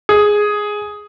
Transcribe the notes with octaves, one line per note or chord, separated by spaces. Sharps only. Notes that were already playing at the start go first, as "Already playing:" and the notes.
G#4